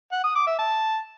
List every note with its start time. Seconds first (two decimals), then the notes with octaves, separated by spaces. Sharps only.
0.12 F#5
0.24 D#6
0.35 D6
0.47 E5
0.59 A5